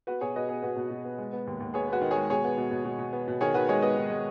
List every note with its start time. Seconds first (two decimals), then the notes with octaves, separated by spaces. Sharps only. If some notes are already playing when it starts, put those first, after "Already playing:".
0.07 B3 F#4 B4
0.21 B2 G#4 C#5
0.35 B2 B4 D#5
0.49 B3 G#4
0.63 B2 F#4 B4
0.76 B2
0.90 B2
1.05 B3
1.18 G#3
1.33 B3
1.47 D#2
1.60 D#2
1.74 B3 G#4 C#5
1.88 B3 F#4 B4
2.01 D#3
2.11 G#4 C#5
2.16 G#3
2.30 B2 G#4 C#5
2.44 B3
2.57 B2
2.71 B2
2.85 B2
2.99 B2
3.13 B3
3.28 B2
3.41 D#3 G#4 C#5
3.54 D#3 F#4 B4
3.69 G#3 G#4 C#5
3.82 B3 B4 D#5
3.97 D#3
4.10 G#3